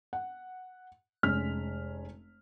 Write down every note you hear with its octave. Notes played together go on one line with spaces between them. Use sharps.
F#5
F1 G#3 C#4 F6 B6